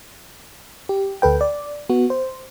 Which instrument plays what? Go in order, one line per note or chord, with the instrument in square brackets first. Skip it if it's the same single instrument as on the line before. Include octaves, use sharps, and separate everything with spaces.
[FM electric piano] G4
D2 A4 B4 G5
D5
B3 F#4
C5